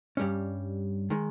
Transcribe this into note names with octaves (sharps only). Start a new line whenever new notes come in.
G2 G3 C#4
D#3 G#3